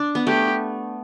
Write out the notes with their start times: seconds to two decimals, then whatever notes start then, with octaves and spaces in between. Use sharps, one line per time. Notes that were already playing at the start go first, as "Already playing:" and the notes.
Already playing: D4
0.15 B3
0.27 A3 G4